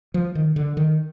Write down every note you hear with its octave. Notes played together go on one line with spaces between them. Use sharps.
F3
D#3
D3
D#3